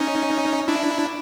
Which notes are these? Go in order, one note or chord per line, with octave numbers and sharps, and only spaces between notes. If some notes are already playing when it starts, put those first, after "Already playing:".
Already playing: C#4 D#4
D4 E4